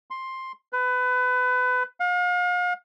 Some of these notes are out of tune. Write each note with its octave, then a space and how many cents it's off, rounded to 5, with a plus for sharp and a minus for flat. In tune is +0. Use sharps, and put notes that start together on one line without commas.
C6 +10
B4 +25
F5 +40